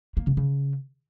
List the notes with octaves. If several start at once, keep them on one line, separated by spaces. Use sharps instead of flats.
A#3
C#3
C#3